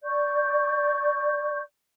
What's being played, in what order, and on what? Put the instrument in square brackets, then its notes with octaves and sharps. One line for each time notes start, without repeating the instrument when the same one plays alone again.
[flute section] D5 C#6 G6